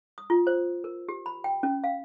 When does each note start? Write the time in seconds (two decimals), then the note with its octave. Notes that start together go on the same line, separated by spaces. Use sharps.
0.18 D#6
0.30 F4
0.47 C5
0.84 A#4
1.09 G4
1.26 B5
1.44 G5
1.63 C#4
1.84 F5